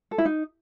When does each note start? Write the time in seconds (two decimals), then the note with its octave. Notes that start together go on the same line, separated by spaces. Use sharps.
0.11 A4
0.18 E4
0.25 D#4